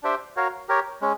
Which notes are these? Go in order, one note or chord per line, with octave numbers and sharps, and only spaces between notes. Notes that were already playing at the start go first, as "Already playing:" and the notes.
D4 G4 C5 E5 G5
F#4 A#4 C#5 F5
G4 A#4 C#5
G#3 C#4